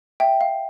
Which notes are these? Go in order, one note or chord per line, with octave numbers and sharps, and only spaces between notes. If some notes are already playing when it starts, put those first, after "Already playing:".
E5 G5
F5